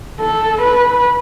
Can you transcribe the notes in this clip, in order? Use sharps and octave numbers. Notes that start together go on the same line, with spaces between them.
A4
B4